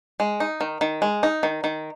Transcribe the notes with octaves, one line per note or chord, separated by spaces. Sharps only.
G#3
D#4
D#3
D#3
G#3
D#4
D#3
D#3